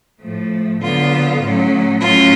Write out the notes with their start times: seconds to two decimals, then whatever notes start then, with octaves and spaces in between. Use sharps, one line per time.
0.20 A2 F3 A3
0.81 D3 F#3 B3 F4
1.42 A2 F#3 C#4
2.01 A2 F#3 C#4 F4